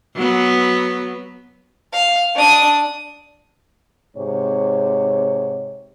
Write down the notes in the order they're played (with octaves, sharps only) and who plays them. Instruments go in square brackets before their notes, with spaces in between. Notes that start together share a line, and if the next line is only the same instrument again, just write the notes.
[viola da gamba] F#3 B3
[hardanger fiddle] F5
D4 D#6
[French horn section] G#2 C3 C#5